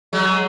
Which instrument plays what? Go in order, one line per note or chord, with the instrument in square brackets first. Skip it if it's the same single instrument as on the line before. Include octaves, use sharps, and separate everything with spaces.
[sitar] F#3 G#3